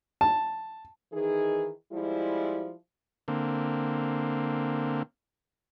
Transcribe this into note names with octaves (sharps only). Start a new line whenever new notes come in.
A5
D#3 E3 D#4 G#4
F3 G3 G#3 E4
D3 A#3 C4